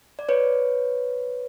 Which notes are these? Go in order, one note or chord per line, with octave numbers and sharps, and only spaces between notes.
D5
B4 C#5